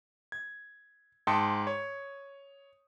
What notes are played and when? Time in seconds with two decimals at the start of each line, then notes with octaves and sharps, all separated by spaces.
0.32 G#6
1.27 G#2 G5 A5 C6 D#6 C#7
1.67 C#5